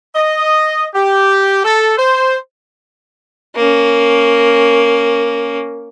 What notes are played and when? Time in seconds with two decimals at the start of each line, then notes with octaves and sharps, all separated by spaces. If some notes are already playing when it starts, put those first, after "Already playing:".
0.15 D#5
0.94 G4
1.64 A4
1.98 C5
3.56 A#3 C#4